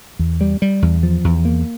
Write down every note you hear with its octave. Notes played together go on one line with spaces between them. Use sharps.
E2
G3
G3
E2
F3
E2
A#3